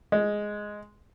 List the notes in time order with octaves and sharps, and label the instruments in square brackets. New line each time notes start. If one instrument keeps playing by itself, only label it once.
[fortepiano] G#3